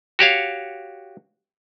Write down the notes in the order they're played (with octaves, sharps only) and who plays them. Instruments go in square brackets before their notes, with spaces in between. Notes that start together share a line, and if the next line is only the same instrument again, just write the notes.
[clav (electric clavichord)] F#4 G4 C#5 F5